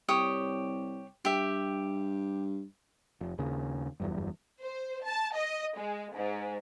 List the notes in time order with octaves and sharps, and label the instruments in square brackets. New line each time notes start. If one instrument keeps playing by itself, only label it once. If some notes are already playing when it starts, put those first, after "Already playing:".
[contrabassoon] C2 [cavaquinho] G4 C#5 D#6
[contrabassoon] G2 [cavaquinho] G4 E5
[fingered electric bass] F1
D#2 C#3
F#1 E2 G2
[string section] C5
A5
D#5
G#3
G#2